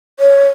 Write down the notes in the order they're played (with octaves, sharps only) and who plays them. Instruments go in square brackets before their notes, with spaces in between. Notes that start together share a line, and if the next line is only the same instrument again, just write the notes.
[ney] C#5